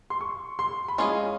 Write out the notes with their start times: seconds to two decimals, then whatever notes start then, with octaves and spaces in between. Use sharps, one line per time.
0.10 C6
0.21 C#6
0.59 C6
0.88 B5
0.98 G#3 C#4 F4 G#4 C6